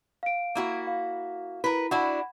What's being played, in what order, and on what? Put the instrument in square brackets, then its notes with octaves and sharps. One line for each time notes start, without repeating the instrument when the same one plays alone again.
[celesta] F5 D7
[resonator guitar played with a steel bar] A#3 E4 F#4
[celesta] F5
[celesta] E4 [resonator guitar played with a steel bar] A#4 B4
[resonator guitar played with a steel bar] D4 E4 F#4 [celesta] F#5 B5